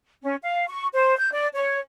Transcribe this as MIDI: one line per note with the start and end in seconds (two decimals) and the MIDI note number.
0.23 0.35 61
0.43 0.65 77
0.69 0.86 85
0.93 1.17 72
1.18 1.31 91
1.33 1.47 74
1.55 1.76 73